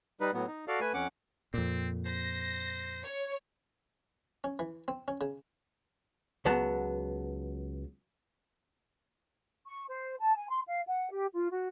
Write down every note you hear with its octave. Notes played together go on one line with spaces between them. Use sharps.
G3 D#4 B4
A2 F#3 B3
D#4
F#4 A4 D5 F5
A3 B4 G#5
F2 C#4 F#5 D6
F2 A#2 C4
C5 A#6
C#5
C#4
E3
C4
C#4
C#3
C#2 F#3 B3 A5
C#6
C5
A5
G#5
C6
F5
F#5
G4
F4
F#4